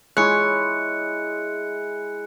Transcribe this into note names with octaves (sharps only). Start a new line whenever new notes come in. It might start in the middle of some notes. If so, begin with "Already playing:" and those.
G#3 E4 C#5 F#6 C#7